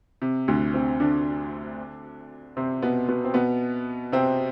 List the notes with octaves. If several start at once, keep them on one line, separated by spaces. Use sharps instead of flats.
C3
D2 D3
C3 C4
D3 D4
C3 C4
B2 B3
B2 B3
C4
B2 B3
C3 C4